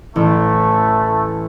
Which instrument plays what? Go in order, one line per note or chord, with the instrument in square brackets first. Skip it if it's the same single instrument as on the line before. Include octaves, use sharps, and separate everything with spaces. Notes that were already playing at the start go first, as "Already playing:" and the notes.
[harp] A1 [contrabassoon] A2 [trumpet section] A3